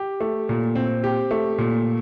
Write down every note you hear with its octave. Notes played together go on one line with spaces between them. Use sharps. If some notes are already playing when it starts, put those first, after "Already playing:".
Already playing: G4
A3
A#2
C4
G4
A3
A#2